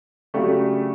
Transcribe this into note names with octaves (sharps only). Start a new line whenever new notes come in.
C#3 F#3 A3 D4 G4